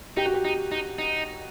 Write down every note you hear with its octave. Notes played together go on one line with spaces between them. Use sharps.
D#4 G4
F#4
G4
D#4
D#4
D#4